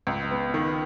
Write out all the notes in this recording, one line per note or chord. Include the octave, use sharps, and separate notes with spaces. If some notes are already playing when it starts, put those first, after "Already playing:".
C#2
B3
D#3